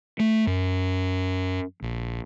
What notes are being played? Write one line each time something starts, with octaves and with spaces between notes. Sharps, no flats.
A3
F#2
A#1